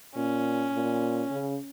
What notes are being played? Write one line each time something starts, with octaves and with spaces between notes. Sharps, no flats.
A#2 C#4
A#2
C#3